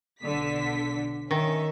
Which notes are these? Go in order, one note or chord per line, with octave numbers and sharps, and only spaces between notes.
B1 D3 B6
D#3 C#4 E5